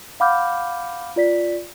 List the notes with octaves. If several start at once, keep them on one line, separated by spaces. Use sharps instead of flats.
F5 F#5 B5 D6 F6 G6
F4 D5 B6